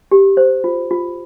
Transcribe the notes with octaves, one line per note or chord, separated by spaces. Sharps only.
G4
C5
F4
F4